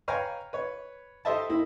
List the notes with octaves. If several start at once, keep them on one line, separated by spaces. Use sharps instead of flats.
B4 C#5 F5 G5 G#5 A#5
B4 C#5
G4 A4 C5 D#5 E5 A5
A#3 D#4 E4